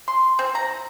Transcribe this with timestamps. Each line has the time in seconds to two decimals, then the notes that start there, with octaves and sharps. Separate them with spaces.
0.08 C6
0.39 C4
0.55 A#5